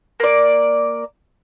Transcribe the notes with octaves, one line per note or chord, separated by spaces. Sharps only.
A#3 D5